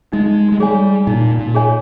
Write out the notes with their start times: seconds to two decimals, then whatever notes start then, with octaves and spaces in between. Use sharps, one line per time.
0.13 G#3 D#4
0.52 G#3
0.60 G3 G#4 C#5 G#5
1.07 A#2 D#4
1.39 A#2
1.54 G#4 C#5 G#5